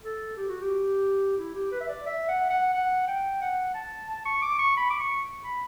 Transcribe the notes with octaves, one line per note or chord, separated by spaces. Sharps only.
A4
G4
F#4
G4
E4
G4
B4
E5
D5
E5
F#5
F#5
F#5
G5
F#5
A5
A5
C#6
D6
C#6
B5
D6
C#6
B5